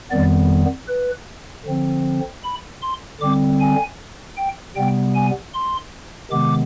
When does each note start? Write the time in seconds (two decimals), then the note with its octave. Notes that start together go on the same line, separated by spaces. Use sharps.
0.11 F2 D#3 G3 B3 D5
0.88 B4
1.66 D3 F3 C4
2.43 B5
2.82 C6
3.21 D3 G3 C4 D6
3.60 G#5
4.37 G5
4.76 C3 G3 B3 G5
5.15 G#5
5.54 C6
6.31 C3 D#3 G#3 B3 D6